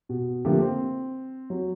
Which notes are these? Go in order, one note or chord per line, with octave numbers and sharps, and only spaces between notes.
B2
D3 F3 A3 A#3 G4
C4
F#3